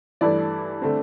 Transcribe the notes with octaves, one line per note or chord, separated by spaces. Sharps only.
G2 E3 A3 E4 D5
D3 A3 C4